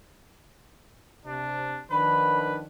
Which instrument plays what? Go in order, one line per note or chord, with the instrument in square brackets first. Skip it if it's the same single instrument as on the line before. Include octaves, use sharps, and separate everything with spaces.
[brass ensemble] C3 [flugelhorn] D4
[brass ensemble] D#3 F3 D4 [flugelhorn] B4 [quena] B5